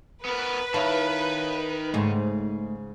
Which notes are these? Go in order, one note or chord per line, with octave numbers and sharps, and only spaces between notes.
B3 A#4 B4
D#3 E4 A#4 C#5 F5 A5
G#2 C#3 A3